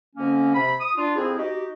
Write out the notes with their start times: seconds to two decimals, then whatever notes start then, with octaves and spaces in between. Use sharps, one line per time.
0.16 F2 D3 A#3 C#4
0.55 C3 B5
0.79 D#6
0.96 D4 F4
1.16 F2 C4 E4 G#4
1.37 D#4 F#4 G4